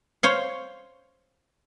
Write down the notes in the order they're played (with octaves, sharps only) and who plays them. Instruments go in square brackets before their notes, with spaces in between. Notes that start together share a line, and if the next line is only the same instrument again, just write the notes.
[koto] C5 C#5 F5